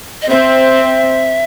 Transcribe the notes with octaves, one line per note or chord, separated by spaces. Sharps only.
D#5
C4 E5